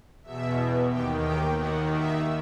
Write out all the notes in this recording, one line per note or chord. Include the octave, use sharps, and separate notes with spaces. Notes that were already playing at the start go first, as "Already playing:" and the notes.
E2 B2 E5
D#2 D#3 G4 G5
G4 G5
D#2 D#3 F#4 F#5
E5